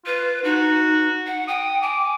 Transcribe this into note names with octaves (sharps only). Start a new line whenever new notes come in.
F4 B4
D#4 F#4
F#5
G5 D#6
G#5 D6